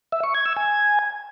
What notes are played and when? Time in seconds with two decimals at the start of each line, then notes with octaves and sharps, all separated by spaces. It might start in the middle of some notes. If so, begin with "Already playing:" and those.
0.12 E5
0.23 C#6
0.34 G#6
0.46 E6
0.57 G#5